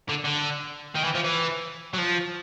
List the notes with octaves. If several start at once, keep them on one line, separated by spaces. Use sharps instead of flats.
D3
D3
D#3
E3
F3
E3
F#3
F3